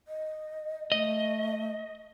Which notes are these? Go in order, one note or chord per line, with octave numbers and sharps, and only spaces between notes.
D#5
A3 D#5